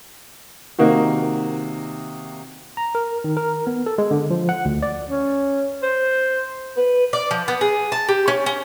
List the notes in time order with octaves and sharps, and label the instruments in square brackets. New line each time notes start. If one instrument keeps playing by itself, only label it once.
[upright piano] C3 D#3 A#3 D#4 F#4
[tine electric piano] A#5
A#4
D#3
A#4
B3
A4
G#3
D3
F3
F#5
D2
D5
[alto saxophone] C#4
C5
B4
[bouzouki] D5
F3
B3
G#4
A5
G4
C#4
C#4